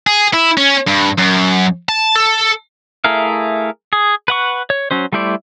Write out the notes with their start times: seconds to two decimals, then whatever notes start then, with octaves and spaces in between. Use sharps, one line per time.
0.07 G#4
0.34 E4
0.57 C#4
0.87 G2
1.18 F#2
1.89 A5
2.16 A4
3.04 A3 E4 G#4 A#4 F5
3.93 G#4
4.28 B4 F#5 C#6
4.70 C#5
4.91 F#3 C#4 C5
5.12 G3 A3 E4 C5 D5